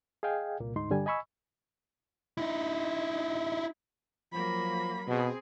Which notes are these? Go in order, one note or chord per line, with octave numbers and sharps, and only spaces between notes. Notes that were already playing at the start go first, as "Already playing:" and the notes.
G#4 D#5 F5 G5 G#5
C2 A#2 A#3
D2 G#2 D#4 C6
G2 D3 G3 G#5
D#5 G#5 B5 C#6 E6
D#4 E4
F3 F#3 A#3 B5
B2 C4 G#4